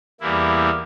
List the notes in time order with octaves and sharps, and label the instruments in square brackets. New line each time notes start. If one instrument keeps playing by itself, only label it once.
[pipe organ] E2 E3 G3 A#3 E4